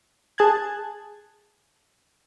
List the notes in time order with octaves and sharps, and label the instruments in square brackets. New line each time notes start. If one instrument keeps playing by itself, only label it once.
[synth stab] G#4 A5 F#6 G#6